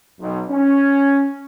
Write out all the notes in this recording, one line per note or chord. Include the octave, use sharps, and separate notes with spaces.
B1
C#4